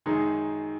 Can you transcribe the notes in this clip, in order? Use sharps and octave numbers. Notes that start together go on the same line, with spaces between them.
F#2 D#3 G#3 D#4 G#4